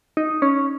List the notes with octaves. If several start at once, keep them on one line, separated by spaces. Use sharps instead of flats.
D#4
C#4